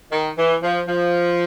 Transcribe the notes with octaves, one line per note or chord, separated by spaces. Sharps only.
D#3
E3
F3
F3